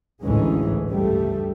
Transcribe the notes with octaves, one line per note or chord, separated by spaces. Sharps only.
A1 D2 G#2 E3 G#3 C#4
C#2 G2 G3 A3